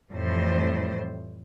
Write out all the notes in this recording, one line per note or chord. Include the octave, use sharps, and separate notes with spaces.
F2 A2 E3 G3 C5